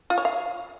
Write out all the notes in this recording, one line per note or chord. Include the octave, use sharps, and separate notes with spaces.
F4
C#5
F5